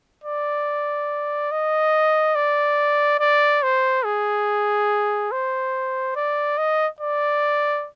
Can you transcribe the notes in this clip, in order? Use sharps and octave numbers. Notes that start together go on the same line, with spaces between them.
D5
D#5
D5
D5
C5
G#4
C5
D5
D#5
D5